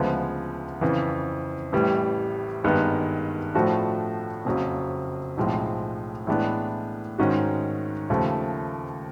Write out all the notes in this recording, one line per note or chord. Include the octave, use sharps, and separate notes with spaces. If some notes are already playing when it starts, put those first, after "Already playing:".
Already playing: D2 C#3 F3 G#3 B3
F2 C#3 E3
A1 A2 E3 G3
G#1 G2 D#3 G#3 B3
A2 F3 A3 D4 F#4
F#1 F2 C#3 F#3
B1 A2 F3 G#3 C4
A2 E3 G#3 B3 D4
G#2 D#3 G#3 C#4 F#4
D#2 C#3 F3 A3